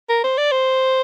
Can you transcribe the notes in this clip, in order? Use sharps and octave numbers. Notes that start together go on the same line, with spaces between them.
A#4
C5
D5
C5